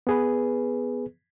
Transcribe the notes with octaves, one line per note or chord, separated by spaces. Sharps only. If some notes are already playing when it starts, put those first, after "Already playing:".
B3 G#4 B4